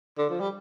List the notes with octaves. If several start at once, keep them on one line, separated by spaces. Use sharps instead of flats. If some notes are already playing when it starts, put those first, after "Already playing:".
D3
F3
G3